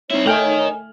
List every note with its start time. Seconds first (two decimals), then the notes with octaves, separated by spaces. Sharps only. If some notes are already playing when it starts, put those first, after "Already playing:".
0.10 C4 D#4 E4 C#5
0.26 A3 A#4 D#5 G5 G#5 F6 F#7